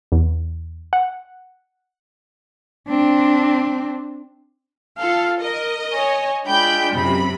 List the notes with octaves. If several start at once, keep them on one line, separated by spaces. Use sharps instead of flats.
E2
F#5
C4 D4
F4 A4 F5
A#4 D#5
C#5 G#5
G#3 D4 F4 G5 B5 G6
F#2 C3 B5